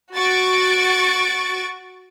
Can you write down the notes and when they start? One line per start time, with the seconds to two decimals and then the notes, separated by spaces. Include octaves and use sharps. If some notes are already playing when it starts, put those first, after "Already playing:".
0.14 F#4 C#6 A6 D7